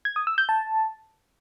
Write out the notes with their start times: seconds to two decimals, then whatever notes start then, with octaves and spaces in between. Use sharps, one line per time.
0.05 G#6
0.16 D#6
0.27 E6
0.38 G6
0.49 A5